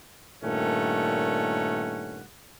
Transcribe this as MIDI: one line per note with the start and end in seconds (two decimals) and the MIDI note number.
0.44 2.23 43
0.44 2.23 46
0.44 2.23 51
0.44 2.23 57
0.44 2.23 61
0.44 2.23 78